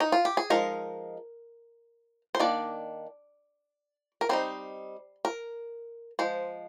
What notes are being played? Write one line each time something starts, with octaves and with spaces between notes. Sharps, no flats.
D#4
F4
G4
G#4
F3 G#3 D#4 A#4
C5
D#3 A#3 D4 D5
A#4
G3 C4 D#4 C5
A#4
F3 G#3 C5